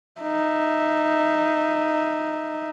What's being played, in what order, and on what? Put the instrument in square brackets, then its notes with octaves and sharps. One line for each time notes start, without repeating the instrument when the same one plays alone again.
[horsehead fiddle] D#4 E5